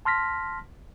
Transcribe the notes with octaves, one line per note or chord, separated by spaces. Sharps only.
A5 C6 F6 A#6 B6